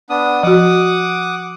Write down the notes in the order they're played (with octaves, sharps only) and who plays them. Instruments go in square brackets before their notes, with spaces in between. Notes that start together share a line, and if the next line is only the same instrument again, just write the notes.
[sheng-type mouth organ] B3 D4 D#6
[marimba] F3 F#4 [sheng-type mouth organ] F#5 D6 D#6